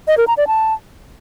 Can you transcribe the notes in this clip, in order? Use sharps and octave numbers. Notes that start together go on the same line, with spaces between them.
D#5
A#4
A#5
D5
A5